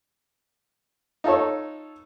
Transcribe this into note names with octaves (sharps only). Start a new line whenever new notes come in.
D#4 F4 A4 C#5